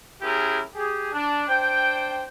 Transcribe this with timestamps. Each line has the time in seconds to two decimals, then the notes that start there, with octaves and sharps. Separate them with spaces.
0.22 C#4 E4 G4 G#4 A#4
0.75 G4 G#4
1.12 D4
1.48 D4 C5 G5